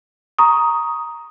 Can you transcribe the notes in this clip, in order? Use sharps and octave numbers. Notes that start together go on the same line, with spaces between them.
A#5 C#6 D#6